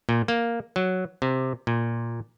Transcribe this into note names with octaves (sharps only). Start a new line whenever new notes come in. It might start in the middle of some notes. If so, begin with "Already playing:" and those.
A#2
A#3
F#3
C3
A#2